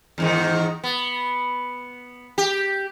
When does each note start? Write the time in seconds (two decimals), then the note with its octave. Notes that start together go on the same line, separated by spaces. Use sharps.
0.18 E2 G#2 D#3
0.84 B3
2.38 G4